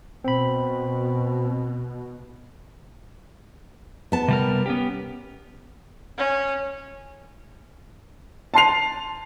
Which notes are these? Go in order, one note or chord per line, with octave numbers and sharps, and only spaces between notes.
B2 C4 B5
B3 A5
C3 G3 A#4
B3 C#4 G4
C#4
A5 C6 C7 F7